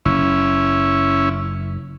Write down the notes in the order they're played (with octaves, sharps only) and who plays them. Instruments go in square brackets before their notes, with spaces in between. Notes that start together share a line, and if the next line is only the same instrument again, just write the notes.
[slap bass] F#1 [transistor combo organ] C#4 E4